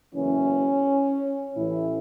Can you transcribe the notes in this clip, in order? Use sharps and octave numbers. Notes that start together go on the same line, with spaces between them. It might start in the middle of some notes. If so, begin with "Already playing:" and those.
F#1 E2 E3 C#4
A1 A2 E3 E4